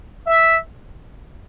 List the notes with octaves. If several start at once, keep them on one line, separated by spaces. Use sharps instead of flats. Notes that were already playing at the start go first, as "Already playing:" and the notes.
E5